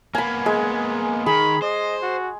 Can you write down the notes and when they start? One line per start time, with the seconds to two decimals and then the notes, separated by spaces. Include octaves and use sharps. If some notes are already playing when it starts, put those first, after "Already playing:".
0.15 A#3 B3 G#5 B5
0.46 G#3
1.26 D#3 G#4 B5
1.62 C5 D#5
2.02 F#4